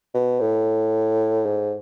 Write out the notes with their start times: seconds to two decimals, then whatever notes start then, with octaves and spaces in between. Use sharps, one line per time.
0.15 B2
0.41 A2
1.46 G#2